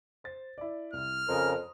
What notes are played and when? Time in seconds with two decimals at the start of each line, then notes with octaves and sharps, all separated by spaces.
0.24 C5 A6
0.58 E4 D5
0.93 C2 E4 F6
1.28 F2 C#3 A#4 C6 D#6